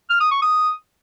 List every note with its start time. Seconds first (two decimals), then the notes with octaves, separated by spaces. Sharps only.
0.10 F6
0.21 D#6
0.31 C#6
0.42 D#6